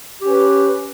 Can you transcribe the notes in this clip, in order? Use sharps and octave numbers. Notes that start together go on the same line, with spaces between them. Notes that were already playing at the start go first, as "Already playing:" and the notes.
C#4 G4 B4